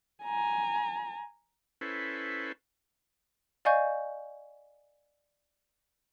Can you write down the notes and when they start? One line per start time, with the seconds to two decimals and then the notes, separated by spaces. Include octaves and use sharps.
0.24 G#5 A#5
1.81 C#4 E4 A4 B4 C5
3.65 D5 D#5 F5 G#5 C#6 G6